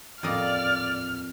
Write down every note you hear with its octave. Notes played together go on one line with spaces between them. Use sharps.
D#1 A1 F2 A#3 D5 D#5 F6